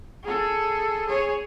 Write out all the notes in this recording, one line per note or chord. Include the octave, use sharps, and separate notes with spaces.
G#4 A4
G#4 C#5